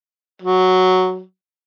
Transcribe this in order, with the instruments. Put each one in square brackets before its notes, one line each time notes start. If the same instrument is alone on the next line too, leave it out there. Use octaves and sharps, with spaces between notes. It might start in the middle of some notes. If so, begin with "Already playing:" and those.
[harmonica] F#3